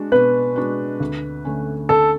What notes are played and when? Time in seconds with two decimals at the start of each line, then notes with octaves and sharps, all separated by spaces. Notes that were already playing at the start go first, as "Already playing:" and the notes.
Already playing: G#3 D4 F#4
0.12 B2 B4
0.56 G#3 D4 F#4
1.00 D2
1.45 D3 A3 C#4
1.89 D2 A4